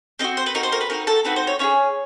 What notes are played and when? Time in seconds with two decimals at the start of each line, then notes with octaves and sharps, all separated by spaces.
0.19 C4 D#4 F#4 D#5
0.37 C5
0.46 B4
0.55 C4 D#4 F#4 A#4
0.63 C5
0.72 A#4
0.81 B4
0.90 C4 D#4 F#4 A#4
1.07 A4
1.24 C4 D#4 F#4 B4
1.36 C5
1.47 C#5
1.59 C#4 E4 G#4 C#5